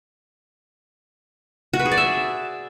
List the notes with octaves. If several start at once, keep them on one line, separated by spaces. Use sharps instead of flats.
F#4
B4
G#4
D5
E5